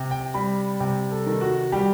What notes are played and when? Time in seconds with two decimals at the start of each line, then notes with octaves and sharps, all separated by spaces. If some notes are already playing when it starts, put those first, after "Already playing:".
Already playing: C3
0.11 G5
0.34 G3 B5
0.80 C3 G5
1.11 A4
1.27 D#3
1.41 F#4
1.72 G3 G4